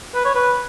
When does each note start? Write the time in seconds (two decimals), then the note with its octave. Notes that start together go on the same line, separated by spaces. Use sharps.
0.15 B4
0.25 C#5
0.35 B4